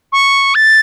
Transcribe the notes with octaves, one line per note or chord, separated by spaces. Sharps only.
C#6
A6